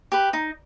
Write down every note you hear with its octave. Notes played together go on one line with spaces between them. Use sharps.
G4 B4
D#4